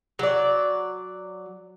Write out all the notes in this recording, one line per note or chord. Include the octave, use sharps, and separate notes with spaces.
F#3 D5